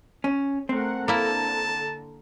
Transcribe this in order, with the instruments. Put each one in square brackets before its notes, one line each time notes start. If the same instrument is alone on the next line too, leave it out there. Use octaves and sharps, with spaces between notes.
[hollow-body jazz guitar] C#4
[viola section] A3 A#4 F#5 [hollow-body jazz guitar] C4
[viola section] D3 A4 A#5 [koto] A#3 E4 [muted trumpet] A5